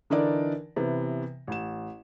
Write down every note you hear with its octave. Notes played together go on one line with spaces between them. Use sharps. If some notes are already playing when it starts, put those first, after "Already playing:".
D3 E3 D4 D#4 A#4 D5
C3 E3 B3
A1 E7